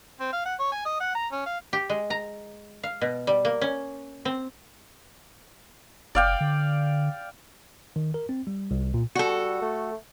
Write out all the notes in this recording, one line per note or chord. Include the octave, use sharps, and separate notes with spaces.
C4
F5
F#5
C#5
G#5
D#5
F#5
A#5
C#4
F5
G4
G#3
A#5
F5
B2
G3
A#3
C#4
C4
F#1 D5 F5 G5
D3
D#3
A#4
C4
G3
C2
A#2
G3 F#4 A4
A3